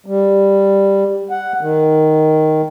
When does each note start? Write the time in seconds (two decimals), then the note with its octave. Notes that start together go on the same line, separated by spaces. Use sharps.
0.06 G3
1.30 F#5
1.61 D#3